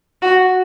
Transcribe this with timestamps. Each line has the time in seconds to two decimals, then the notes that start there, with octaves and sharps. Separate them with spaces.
0.22 F#4